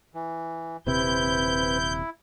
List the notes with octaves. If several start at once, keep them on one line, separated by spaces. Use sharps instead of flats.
E3
D#1 C3 C4 E4 B4 G6